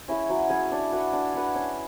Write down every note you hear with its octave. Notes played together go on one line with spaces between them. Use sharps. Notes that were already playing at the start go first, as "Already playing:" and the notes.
C#4 E4 G#4
F#3
C#4 E4 G#4
D4
F#4 B4
D4
F#4 B4
C#4